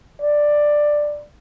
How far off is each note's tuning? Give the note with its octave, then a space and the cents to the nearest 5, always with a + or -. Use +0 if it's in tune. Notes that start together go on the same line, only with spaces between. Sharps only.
D5 +10